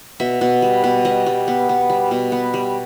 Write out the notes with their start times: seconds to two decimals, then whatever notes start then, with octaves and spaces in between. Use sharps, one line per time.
0.20 B2 E5
0.41 B2
0.62 G3
0.84 B2
1.05 G3 D#5
1.26 G3
1.48 B3
1.69 B3
1.89 G3
2.11 B2
2.32 B3
2.54 G3